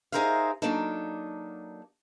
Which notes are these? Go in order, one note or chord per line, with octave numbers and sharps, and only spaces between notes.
D#4 G#4 A#4 C5 E5 F5
F#3 A#3 D4 D#4 A4